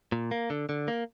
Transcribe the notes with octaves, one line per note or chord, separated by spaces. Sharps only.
A#2
A#3
D3
D3
A#3